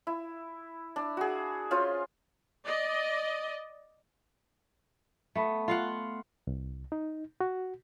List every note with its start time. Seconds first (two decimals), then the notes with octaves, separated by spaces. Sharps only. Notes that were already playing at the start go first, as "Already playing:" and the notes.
0.07 E4
0.96 D4
1.17 F#4 G#4
1.71 C#4 F4 C5
2.66 D5 D#5
5.35 A3 B3
5.68 F4 F5 F#5
6.47 C2
6.92 D#4
7.41 F#4